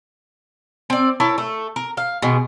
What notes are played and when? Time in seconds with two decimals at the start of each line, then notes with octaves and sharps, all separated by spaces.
0.90 C4 D5
1.20 E4 A#4 C#5 A5
1.38 A3
1.76 A#4
1.97 F5
2.22 B2 D#3 G#3